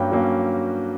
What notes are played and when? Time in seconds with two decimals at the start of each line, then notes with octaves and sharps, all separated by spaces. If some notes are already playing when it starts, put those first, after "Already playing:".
Already playing: G2 F#3 A#3 C#4 G5
0.12 F#3 A#3 C#4